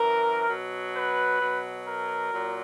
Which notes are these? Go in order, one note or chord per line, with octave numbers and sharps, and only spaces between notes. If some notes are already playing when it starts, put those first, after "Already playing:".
Already playing: F#2 E3 A#4
B2 F#3
B4
B2 F#3
A#4
A#2 F#3